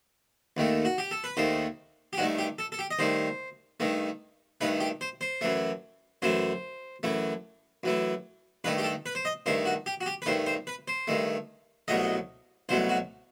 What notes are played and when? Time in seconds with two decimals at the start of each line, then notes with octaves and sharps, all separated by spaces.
0.57 D#2 D#3 A3
0.85 F#4
0.98 G4
1.11 A4
1.24 B4
1.37 D#2 D#3 A3 C5
2.13 G4
2.18 G2 D#3 A3 F#4
2.38 G4
2.59 A4
2.72 A4
2.79 G4
2.91 D#5
2.99 G2 D#3 A3 C5
3.80 G2 D#3 A3
4.61 G2 D#3 A3 B4
4.80 G4
5.01 C5
5.21 C5
5.41 F#2 E3 A3
6.22 F#2 E3 A3 C5
7.03 F#2 E3 A3
7.84 F#2 E3 A3
8.64 G2 D#3 A3 B4
8.78 G4
8.84 A4
9.06 B4
9.15 C5
9.25 D#5
9.46 G2 D#3 A3 C5
9.66 F#4
9.86 G4
10.01 F#4
10.06 G4
10.22 B4
10.26 G2 D#3 A3 C5
10.46 C5
10.67 B4
10.88 C5
11.08 G2 D#3 A3
11.88 C2 B2 F#3 A3 D#5
12.69 C2 B2 F#3 A3 C5
12.89 F#4